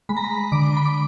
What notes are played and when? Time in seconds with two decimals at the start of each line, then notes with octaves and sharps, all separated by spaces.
0.09 G#3 B5
0.17 A#5
0.24 B5
0.52 D3 D6
0.77 B5
0.85 D6